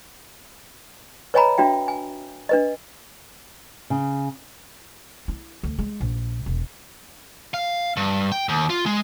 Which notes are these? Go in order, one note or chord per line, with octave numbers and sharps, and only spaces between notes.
B4 C#5 D#5 G#5 A#5 B5
D4 F#4 E5 G5
G#5
D4 B4 D#5
C#3
E4
D2
G#3
A#1
E1
F5
G2
G5
D#2
F4
G#3